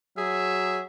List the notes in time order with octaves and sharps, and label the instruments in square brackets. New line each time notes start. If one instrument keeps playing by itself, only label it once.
[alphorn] F#3 [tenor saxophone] G#4 [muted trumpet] E5